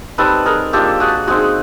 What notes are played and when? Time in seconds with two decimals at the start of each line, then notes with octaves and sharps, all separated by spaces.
0.18 G3 C4 D#4 A4 B4
0.46 G#4 A#4
0.73 A#3 D4 F4 G4 A4
1.00 F#4 G#4
1.28 G#3 C4 D#4 F#4 G#4